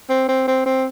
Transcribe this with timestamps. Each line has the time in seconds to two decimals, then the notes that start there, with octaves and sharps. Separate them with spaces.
0.10 C4
0.29 C4
0.48 C4
0.66 C4